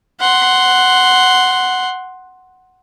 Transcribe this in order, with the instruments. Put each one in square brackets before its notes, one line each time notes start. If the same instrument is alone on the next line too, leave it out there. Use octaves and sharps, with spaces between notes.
[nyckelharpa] F#5 C6